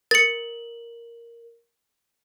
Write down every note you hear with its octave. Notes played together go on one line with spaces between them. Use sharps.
A#4 A6 C#7 F#7